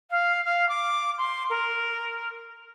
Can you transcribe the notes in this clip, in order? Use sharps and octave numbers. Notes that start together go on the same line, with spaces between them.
F5
F5
D6
C6
A#4